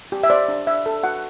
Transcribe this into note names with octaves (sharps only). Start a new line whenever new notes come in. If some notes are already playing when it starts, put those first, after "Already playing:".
G4
E5
C5 D5
D4
D4 E5
A4
F#4 F#5